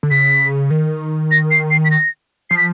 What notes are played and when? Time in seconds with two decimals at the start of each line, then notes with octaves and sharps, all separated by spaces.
0.03 D3
0.11 C#3 B6
0.70 D#3
1.31 A#6
1.51 C7
1.71 C7
1.85 B6
1.91 A#6
2.50 F3 C7
2.57 B6